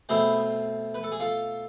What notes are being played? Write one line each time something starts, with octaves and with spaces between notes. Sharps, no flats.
B2 A3 C4 E4 G#4
B4
A4
G#4
F4 A4